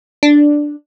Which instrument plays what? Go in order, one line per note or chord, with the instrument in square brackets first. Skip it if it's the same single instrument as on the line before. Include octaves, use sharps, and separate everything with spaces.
[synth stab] D4